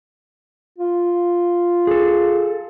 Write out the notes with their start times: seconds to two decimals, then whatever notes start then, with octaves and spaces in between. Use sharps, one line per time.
0.78 F4
1.87 G#4 A4